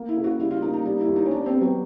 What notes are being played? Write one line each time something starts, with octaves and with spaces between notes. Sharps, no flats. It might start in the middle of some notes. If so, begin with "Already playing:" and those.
Already playing: A#3
E4
C#3
F#4
G3 E4
F4
A#3 D#4
D#4
G3 D#4
E4
D#2
D#4
C#4
G3 D4
C4
B3
F#3